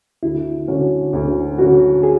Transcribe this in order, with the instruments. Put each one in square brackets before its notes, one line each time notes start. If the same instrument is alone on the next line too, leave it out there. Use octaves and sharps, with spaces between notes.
[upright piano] D2 [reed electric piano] E4
[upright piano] D3 F#3 C#4 F#4
D2
D3 F#3 C#4 F#4
[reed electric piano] G#4